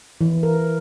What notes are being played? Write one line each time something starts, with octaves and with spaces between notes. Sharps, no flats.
E3
A#4